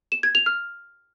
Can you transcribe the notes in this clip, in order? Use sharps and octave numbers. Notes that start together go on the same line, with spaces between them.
E7
G#6
F7
F6